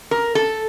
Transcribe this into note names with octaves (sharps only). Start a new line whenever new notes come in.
A#4
A4